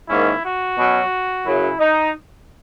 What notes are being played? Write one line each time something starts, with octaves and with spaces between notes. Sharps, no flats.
G#2 D#3 A#3 C#4 E4
F#4
B2 F#3 C#4
F#2 C#3 F#3 E4
D#4